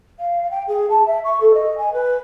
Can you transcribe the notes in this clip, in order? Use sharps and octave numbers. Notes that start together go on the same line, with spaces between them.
F5
G5
G#4
A5
E5
C#6
A4
D#5
G#5
B4